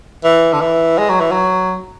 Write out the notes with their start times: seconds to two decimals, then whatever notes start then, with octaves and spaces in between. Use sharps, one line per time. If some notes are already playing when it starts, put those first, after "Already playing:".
0.24 E3
0.53 D3
0.61 E3
0.98 G#3
1.09 F#3
1.20 E3
1.32 F#3